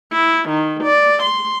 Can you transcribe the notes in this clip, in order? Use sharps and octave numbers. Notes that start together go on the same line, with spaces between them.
E4
D#3
D5
C6